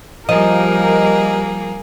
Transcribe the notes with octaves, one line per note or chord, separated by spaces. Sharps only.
F3 G3 A#3 G4 G#4 A#4 D#5